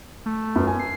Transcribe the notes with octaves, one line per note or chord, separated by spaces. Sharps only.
A3
F#2 B4
G#5
C7